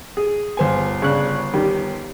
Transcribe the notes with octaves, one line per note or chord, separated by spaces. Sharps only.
G#4
G1 C5 G#5
C#3 D4 F#6
D#3 G3 G4